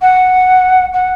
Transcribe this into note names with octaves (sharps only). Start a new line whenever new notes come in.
F#5
F#5